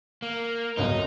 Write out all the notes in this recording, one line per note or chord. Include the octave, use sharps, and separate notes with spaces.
A#3
G1 C#2 F#2 D#4